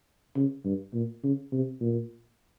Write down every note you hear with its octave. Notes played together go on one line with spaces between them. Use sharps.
C#3
G2
A#2
C#3
C3
A#2